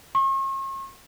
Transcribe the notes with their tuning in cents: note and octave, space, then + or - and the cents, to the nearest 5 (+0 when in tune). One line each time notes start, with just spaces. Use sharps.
C#6 -45